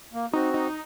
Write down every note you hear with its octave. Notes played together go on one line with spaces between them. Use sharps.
A#3
C4 D#4 F#4
D#4